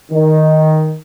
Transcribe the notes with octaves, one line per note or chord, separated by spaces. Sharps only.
D#3